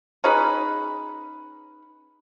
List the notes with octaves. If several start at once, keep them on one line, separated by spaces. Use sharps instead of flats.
C#4 D#4 G#4 B4